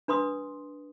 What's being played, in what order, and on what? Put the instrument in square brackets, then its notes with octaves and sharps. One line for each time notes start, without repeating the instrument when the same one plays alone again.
[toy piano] D4 B4 C6 D#6